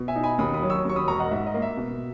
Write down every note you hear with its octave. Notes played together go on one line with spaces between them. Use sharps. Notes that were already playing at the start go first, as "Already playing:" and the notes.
Already playing: B2
E5 G#5
D#4
G#5 B5
D#2 B5 D#6
B5 D#6
F#3
C#6 E6
D#2 C#6
B5 D#6
E1 A#5 C#6
D#5 F#5
G#2 E5
D#5
A#3
E5
B2